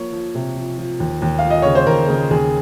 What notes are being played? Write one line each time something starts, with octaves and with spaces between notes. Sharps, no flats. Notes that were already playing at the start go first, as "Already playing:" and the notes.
Already playing: F3 A#3 C#5
F3
C3
F3
F3
D#2
D#2
F3 F5
D#5
C#3 C#5
C5
D#2 A#4
C#3 A#4
D#2 G#4